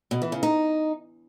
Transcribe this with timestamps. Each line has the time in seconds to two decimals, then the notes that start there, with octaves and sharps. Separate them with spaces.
0.11 B2
0.22 E3
0.32 C#3
0.43 D#4